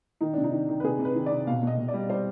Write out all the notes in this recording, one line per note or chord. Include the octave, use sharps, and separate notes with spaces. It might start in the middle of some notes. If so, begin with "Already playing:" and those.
D#3 D#4
C3 D4
D#4
D#3
D#3
B4
C3 G#4
C3
B4
D#3
D5
C3
B2 F5
B2 D#5
B2
D5
G3
G3 C5